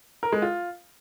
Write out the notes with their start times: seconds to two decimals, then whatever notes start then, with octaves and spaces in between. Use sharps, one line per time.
0.23 A#4
0.32 G#3
0.42 F4